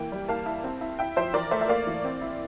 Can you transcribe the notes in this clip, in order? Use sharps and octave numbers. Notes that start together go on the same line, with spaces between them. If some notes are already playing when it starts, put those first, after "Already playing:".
Already playing: E3 A#3 G5
G3
A#3 F5 A5
E4
C4
E4
E4 E5 G5
F3 C5 E5
E3 A#4 D5
A3 C5 E5
E5
A#3 D5 F5
E3
C4
E4